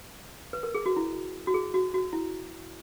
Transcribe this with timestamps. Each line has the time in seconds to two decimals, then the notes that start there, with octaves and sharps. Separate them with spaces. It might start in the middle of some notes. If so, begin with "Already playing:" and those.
0.53 B4
0.63 A#4
0.75 G#4
0.86 F#4
0.96 E4
1.47 F#4
1.54 G#4
1.74 F#4
1.94 F#4
2.13 E4